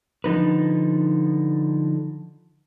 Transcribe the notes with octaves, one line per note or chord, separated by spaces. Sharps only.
D3 F3 D#4 B4